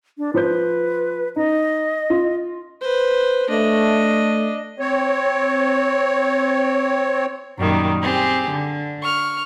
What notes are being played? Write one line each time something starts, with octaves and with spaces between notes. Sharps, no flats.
D4
F3 B4 C5 G6
D#4 D#5
F4
B4 C5
A3 D4 D#5
C4 C#5
F#2 A#2 D#3 G3
C4 G4 G#4
D3
C#6 F6